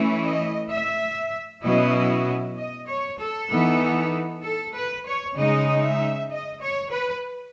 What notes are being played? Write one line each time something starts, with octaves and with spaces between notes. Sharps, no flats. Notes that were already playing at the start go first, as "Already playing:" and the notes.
Already playing: E3 A3 C#4 E4
D#5
E5
B2 F#3 C#4 E4 D#5
D#5
C#5
A4
E3 B3 D#4
A4
B4
C#5
C#3 G#3 D#4 D#5
E5
D#5
C#5
B4